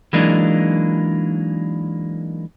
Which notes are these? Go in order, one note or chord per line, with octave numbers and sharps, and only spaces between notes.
E3 F#3 G#3 A#3 D4 D#4